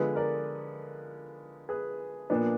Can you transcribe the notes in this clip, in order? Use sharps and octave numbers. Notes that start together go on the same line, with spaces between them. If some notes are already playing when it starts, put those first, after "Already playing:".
Already playing: D3 F3 G#3 B3 G#4 B4
A#4 D5
G#4 B4
A#2 F3 B3 D4